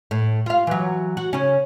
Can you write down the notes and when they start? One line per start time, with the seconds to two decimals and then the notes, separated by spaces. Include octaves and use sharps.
0.11 A2
0.46 F4 F5
0.67 E3 F#3
1.17 F#4
1.33 C#3 C#4